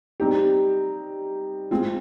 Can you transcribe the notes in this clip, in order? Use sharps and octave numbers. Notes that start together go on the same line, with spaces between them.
G3 C4 D#4 G4
G#3 C4 F4